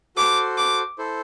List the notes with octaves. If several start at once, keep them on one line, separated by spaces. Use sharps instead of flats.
F#4 A4 C5 D6
D6
E4 A4 C5